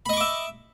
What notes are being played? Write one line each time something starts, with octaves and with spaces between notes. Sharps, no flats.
D#5 E5 B5 C#6 D6